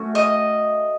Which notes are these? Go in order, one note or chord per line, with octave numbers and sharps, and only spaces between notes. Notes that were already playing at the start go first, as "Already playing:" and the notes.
Already playing: A3 C#4 F#4
D#5